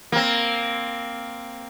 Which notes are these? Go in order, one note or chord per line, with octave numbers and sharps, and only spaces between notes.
A#3 C4